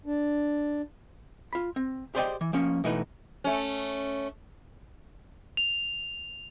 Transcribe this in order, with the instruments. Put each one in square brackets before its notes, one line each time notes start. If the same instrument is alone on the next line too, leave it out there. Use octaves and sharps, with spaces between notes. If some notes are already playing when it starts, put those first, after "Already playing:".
[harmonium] D4
[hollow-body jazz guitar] F4 B5
C4
G4 G#4 C5 D5 D#5 G5
E3
F3 A#3 C#4
B2 E3 A3 D#4 B4
[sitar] A3 C#4
[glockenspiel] F7